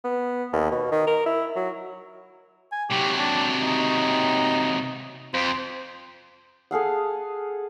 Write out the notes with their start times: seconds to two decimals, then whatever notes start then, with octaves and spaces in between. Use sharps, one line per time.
0.04 B3
0.53 D#2
0.72 B2
0.92 D#3
1.07 A#4
1.26 E4
1.56 F#3
2.72 G#5
2.90 C3 F#3 G4
3.18 D4
3.61 D#4
5.34 F2 C5
6.71 G#4 A4 F5 F#5